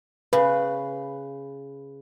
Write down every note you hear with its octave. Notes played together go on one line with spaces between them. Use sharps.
C#3 B4